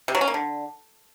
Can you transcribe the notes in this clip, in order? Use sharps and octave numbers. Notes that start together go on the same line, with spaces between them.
C3
F#3
C#4
A#3
D3